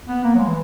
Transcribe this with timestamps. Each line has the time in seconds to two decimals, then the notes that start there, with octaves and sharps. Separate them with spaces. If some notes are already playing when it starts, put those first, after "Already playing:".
0.08 B3
0.24 A#3
0.35 F#3
0.39 G#3
0.48 E3